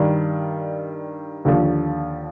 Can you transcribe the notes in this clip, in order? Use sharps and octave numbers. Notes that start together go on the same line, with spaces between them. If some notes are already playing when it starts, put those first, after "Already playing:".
Already playing: G2 D#3 G3
D#2 D3 F3